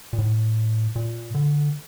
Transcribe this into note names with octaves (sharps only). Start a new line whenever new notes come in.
A#2
A2
A#2
D3